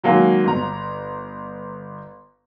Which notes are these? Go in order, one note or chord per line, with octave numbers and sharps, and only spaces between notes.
D#3 F#3 G#3 A#3
G1 A#5